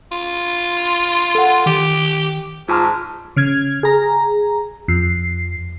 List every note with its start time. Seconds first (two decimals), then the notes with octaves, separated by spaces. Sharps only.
0.12 F4
1.35 A4 F#5
1.66 D#3 G4
2.69 G#2 F4 A5 F6
3.36 C#3 F6 G#6
3.83 G#4 A#5
4.88 F2 C7